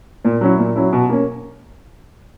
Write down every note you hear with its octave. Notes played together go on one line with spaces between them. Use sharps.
A#2
F#3 C#4 E4
A#2
F#3 C#4 E4
B2
A#3 C#4